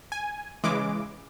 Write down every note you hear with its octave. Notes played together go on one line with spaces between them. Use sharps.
G#5
C#3 E3 G#3 D6